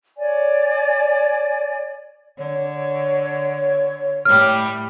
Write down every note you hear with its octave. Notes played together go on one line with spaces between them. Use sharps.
C#5 D5 G#5
D3 C#5
A2 G3 F6